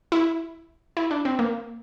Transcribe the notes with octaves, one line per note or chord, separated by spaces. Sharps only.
E4
E4
D4
C4
A#3